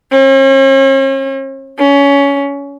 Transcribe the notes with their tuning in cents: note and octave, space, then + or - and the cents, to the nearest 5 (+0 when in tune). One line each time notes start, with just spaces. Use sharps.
C#4 -45
C#4 +20